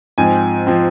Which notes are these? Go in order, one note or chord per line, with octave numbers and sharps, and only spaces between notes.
G#2 F3 C4 G#5
F3 C4